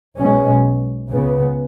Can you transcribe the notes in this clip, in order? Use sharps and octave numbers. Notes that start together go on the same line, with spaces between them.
B1 B2 G#3 C#4
C#2 C#3 B3